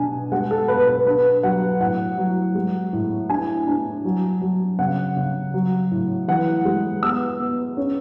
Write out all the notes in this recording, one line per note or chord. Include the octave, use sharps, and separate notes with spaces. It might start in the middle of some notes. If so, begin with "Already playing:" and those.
Already playing: B2 D4 G#5
G#3 F#5
A4
B2 B4
B4
D4 B4
F#3 F#5
A2 F#5
F#3
G#3
A2
D4 G#5
D4
F#3
F#3
C#3 F#5
C#3
F#3
A2
E3 F#5
G#3
B3 E6
B3
C#4